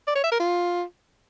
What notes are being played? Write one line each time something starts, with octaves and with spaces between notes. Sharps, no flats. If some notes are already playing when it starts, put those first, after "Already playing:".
D5
C#5
E5
A#4
F4